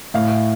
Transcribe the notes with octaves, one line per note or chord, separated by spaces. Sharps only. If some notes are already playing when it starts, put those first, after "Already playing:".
A2 F5